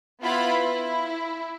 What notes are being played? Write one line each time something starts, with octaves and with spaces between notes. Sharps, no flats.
B3 E4 F4 B5
E4